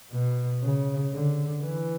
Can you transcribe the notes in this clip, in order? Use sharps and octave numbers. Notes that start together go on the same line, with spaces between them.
B2
C#3
D3
E3